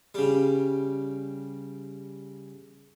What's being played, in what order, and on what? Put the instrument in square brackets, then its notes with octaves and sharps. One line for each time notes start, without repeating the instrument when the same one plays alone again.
[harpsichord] C#3 G3